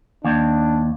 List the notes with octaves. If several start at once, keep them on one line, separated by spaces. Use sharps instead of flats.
D#2 D4